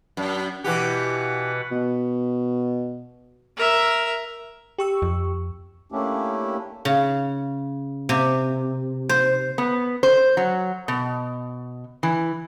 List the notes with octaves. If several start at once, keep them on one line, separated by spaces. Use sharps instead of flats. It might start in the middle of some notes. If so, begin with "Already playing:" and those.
F#2
B2 E3 G4 B4 F#5
B2
A#4 E5
G4 C#6 E6
F2
A3 A#3 C#4 D4 E4 G4
C#3
C3
C5
B3
C5
F#3
B2
E3